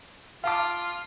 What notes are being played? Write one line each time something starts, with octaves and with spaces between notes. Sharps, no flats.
F4 F5 A5 D6